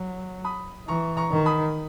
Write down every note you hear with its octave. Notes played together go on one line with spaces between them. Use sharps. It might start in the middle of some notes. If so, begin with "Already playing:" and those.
Already playing: F#3
B5 D#6
E3 A#5 C#6
A#5 C#6
D#3
B5 D#6